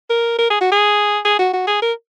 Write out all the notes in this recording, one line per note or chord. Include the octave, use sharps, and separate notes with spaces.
A#4
A#4
G#4
F#4
G#4
G#4
F#4
F#4
G#4
A#4